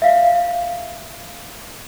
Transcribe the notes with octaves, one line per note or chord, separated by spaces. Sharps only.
E5 F5